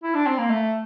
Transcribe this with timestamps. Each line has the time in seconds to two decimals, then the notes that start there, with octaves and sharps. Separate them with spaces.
0.03 E4
0.14 D4
0.27 C4
0.38 A#3
0.50 A3